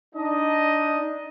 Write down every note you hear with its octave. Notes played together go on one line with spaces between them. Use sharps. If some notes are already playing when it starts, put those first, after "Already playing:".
D4 D#4 D#5